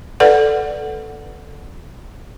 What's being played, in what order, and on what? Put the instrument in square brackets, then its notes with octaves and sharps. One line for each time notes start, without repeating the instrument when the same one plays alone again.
[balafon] A4 B4 D5 F#5